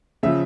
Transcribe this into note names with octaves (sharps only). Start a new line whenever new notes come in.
C#3 F3 E5